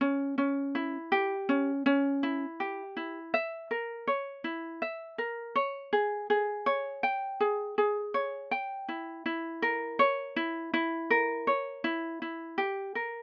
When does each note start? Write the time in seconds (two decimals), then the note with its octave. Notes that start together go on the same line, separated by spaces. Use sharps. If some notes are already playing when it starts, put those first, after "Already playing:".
0.01 C#4
0.38 C#4
0.75 E4
1.12 G4
1.49 C#4
1.86 C#4
2.23 E4
2.60 G4
2.97 E4
3.34 E5
3.71 A#4
4.07 C#5
4.44 E4
4.82 E5
5.18 A#4
5.56 C#5
5.93 G#4
6.30 G#4
6.66 C#5
7.03 G5
7.40 G#4
7.78 G#4
8.14 C#5
8.51 G5
8.89 E4
9.26 E4
9.62 A#4
9.99 C#5
10.36 E4
10.74 E4
11.10 A#4
11.47 C#5
11.84 E4
12.22 E4
12.58 G4
12.95 A#4